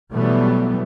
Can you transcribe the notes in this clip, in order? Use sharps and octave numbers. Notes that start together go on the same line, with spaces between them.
B2 E3 F#3 G3 A3 B3